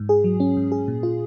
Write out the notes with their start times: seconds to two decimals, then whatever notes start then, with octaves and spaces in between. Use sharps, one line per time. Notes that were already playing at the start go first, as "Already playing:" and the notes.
Already playing: G#2
0.09 G#4
0.24 F#3
0.40 C#4
0.57 G#2
0.72 G#4
0.88 A#2
1.03 F4